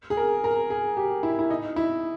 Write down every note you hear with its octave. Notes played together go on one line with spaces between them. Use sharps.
G#4
A#4
A#4
G#4
G4
E4
E4
D#4
E4